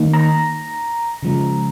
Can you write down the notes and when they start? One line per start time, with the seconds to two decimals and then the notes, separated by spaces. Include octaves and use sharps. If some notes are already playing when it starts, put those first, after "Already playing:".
Already playing: D#3 A#3 D#4
0.13 A#5
1.23 C#3 F3 G#3